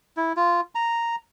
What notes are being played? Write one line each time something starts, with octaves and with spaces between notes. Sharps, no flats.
E4
F4
A#5